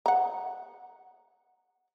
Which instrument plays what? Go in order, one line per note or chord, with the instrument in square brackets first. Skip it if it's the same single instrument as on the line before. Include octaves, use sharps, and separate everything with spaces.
[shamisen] F#5 A#5